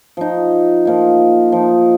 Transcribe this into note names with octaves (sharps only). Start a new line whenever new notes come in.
F3 D#4
F3 A#3 D#4
F3 D#4